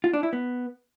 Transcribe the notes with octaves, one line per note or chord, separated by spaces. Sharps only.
F4
D4
E4
B3